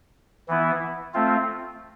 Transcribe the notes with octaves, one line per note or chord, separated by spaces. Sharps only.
E3 B3 E4
A3 C4 F4